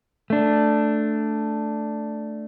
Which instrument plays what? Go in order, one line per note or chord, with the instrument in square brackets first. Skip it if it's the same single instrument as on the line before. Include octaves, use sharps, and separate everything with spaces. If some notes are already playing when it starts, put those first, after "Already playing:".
[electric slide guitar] A3 D4